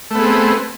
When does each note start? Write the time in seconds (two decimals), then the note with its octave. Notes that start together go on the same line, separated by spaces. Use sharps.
0.11 A3
0.15 B3
0.19 G#4
0.24 C4